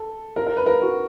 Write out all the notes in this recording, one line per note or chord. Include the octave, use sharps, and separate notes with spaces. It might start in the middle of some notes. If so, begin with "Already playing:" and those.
Already playing: A4
A#4
A#4
B4
A#4
F#4